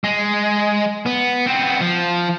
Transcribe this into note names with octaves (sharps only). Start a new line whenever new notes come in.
G#3
B3
B3 C4
F3